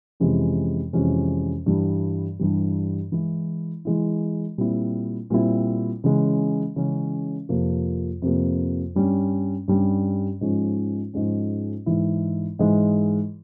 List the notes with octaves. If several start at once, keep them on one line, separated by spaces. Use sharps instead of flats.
F2 C3 E3 G#3 C#4
F2 C3 E3 G#3 C#4
G2 E3 G3
G2 E3 G3
E3 G#3 E4
E3 G#3 E4
A#2 G3 C4 E4
A#2 G3 C4 E4
C#3 E3 G#3 C#4
C#3 E3 G#3 C#4
F2 C3 F3 A#3
F2 C3 F3 A#3
G2 G3 C#4
G2 G3 C#4
G#2 F3 G#3 C#4
G#2 F3 G#3 C#4
G#2 E3 G#3 E4
G#2 E3 G#3 E4